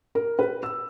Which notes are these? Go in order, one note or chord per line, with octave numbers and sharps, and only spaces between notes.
A#4
B4
E6